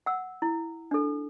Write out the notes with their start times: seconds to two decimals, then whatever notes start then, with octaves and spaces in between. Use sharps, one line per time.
0.06 F#5 E6
0.42 E4
0.91 D4 A4